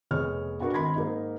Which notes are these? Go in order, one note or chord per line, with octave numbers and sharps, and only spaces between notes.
F1 B3 G#4 C#5 F6
B3 D4 F#4 A4 A#4
G#1 B5 C6 G#6 A#6
G#2 A#3 D#4